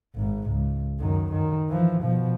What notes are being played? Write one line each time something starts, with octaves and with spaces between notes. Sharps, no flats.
G#1 G#2
C#2
F#2 D#3
D#3
E3 F3
B2 F3